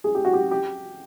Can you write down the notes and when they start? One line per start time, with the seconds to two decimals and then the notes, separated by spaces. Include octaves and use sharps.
0.04 G#4
0.15 G4
0.25 F#4
0.33 G4
0.51 G4